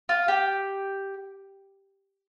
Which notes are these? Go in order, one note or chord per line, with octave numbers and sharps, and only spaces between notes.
F4
G4